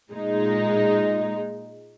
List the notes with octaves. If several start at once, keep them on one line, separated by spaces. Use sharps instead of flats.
A#2 G#3 D#4